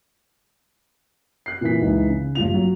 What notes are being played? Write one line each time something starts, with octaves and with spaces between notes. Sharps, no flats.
F#6 C7
A#2 E3 B6
C#2 E3 D#4
C#3
A1 G2 F4 F7
F#3